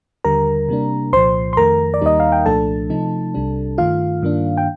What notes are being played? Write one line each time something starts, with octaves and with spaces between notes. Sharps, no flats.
D#2 D3 G3 A#4 A#5
C3 G3 A#3 D4
C2 A#2 F3 C5 C6
C6
F2 D#3 A3 A#4 A#5
D5
D#2 D#3 G3 A#3 D#4 D#5
F5
G5
C2 A#2 F3 A3 D4 A4 A5
C3 F3 A3 D#4
C2 C3 G3 D4
G2 D#3 A3 F4 F5
G2 D#3 A#3 D4
G5